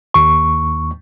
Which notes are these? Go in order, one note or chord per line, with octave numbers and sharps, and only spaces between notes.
D#2 C#6